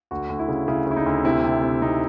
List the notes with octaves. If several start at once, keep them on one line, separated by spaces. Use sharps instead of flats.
D2 F#4
D2
E4
C#3
C#3 E4
C#3 E4
D#4
D2
C3 E4
C3
C3
C3 D#4